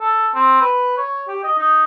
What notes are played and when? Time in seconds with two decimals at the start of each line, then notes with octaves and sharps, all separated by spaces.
0.01 A4
0.35 C4
0.61 B4
0.97 C#5
1.28 G4
1.44 D#5
1.58 D#4